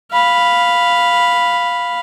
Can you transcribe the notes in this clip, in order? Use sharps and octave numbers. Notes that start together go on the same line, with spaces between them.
F5 B5